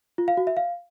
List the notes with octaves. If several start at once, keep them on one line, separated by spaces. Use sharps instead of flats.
F4
F5
F#4
E5
F5